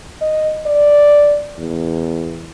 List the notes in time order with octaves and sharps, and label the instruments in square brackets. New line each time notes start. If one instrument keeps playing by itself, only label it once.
[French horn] D#5
D5
E2